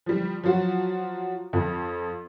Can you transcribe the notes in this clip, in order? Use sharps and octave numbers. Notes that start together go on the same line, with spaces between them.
F3 G3
F3 F#3 F4 F#4
F2 F3